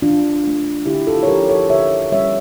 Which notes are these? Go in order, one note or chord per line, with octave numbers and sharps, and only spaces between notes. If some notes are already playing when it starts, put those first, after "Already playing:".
E3 D4 F4
A3 D4
D3 E4 G4
F4 A4
C#5
F3 C#4 G4 A#4
A4 C#5
D3 C#5 E5
G3 C#4 C#5 E5